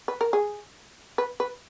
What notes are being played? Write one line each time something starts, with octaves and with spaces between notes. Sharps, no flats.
B4
A#4
G#4
B4
B4